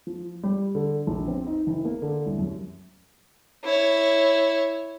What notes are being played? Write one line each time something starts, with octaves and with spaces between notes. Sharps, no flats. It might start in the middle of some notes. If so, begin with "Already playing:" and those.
F3
G3
D3
A#1
C4
D#4
F#1
A#3
D3
C2
F#2
E4 C#5